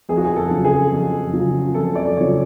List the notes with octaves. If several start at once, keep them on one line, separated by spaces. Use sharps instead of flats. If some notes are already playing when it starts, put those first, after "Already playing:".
F2 G#4
F#4
G#4
A4
C#3 F#3
G#4
F2
C#3 F#3
F2 A4
D5
C#3 F#3 C#5